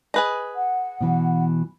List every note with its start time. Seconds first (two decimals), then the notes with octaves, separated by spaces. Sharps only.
0.14 G#4 B4 D#5
0.54 F#5
1.00 B2 E3